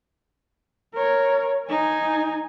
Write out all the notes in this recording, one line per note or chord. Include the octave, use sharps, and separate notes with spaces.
A#4 C#5
D#4 G#5